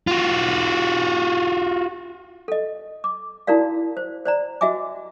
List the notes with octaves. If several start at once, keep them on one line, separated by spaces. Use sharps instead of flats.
F4 F#4
A4 D#5
D6
D#4 E4 F#4 A#4 D5 F5
C5
C5 D5 A#5
F#4 D#5 E5 G#5 D6